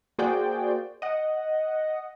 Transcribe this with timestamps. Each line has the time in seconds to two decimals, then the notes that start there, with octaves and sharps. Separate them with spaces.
0.19 A#3 F#4 G#4 C5 D5 G5
1.02 D#5 F#5